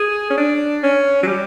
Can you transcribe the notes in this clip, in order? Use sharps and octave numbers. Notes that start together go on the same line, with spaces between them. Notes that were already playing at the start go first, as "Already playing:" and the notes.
Already playing: G#4
C#4
D4
C#4
F#3
G3